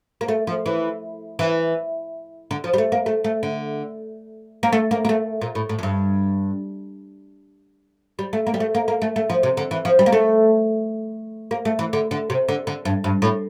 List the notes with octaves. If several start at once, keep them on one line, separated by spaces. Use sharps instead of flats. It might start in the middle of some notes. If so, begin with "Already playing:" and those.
A#3
A3
F3
E3
E3
D3
F3
G3
A3
A#3
A3
A3
D3
A#3
A3
A#3
A#3
A3
A#2
A2
A2
F2
G2
G3
A3
A#3
G3
A3
A#3
A#3
A3
A3
F3
C3
D3
E3
F3
G3
A#3
A3
A#3
A3
E3
D3
D3
C3
D3
D3
G2
G2
A2